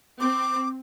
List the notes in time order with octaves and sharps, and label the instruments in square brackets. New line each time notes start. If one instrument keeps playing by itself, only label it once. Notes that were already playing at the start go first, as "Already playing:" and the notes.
[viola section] C4 [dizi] D6